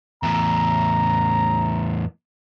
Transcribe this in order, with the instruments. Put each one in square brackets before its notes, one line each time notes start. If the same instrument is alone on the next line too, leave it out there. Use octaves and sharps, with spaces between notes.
[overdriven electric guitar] E2 A2 [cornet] A#5